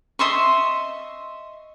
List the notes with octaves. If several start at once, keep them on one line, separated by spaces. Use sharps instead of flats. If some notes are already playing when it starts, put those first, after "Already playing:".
D#5 E5 C6 C#6